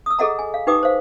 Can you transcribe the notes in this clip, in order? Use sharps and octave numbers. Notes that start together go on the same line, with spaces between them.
D#6 E6
G#4 A4 D#5 F#5 A#5
G#5
F5
D#4 G4 B4 G5 D6 D#6
C5 F5